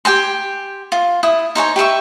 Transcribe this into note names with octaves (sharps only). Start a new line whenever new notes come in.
G4 G5 G#5 C6
F4
E4 D#6
D#4 C5 C#5 G#5
G4 B4 E5 C#6